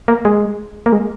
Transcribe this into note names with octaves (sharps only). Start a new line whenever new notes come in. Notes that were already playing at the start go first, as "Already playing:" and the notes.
A#3
G#3
A#3
G#3